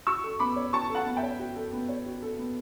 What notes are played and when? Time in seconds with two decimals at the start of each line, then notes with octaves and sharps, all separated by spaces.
0.07 F#4 C#6 E6
0.24 A4
0.39 B3 B5 D6
0.56 C#5
0.73 F#4 A5 C#6
0.89 A4
0.95 F#5 A5
1.06 B3
1.17 E5 G5
1.23 C#5
1.39 F#4
1.56 A4
1.73 B3
1.89 C#5
2.06 F#4
2.22 A4
2.39 B3